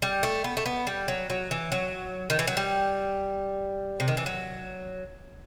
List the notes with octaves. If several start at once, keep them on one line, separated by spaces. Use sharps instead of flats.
G3
A3
B3
A3
B3
G3
F#3
F#3
E3
F#3
D#3
E3
F#3
G3
C3
D#3
E3
F#3